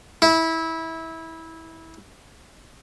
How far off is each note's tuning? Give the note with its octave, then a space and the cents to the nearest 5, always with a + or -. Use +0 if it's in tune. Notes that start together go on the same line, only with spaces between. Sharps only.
E4 -20